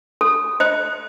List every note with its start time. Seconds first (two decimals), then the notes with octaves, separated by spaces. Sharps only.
0.21 A4
0.60 C5 D#5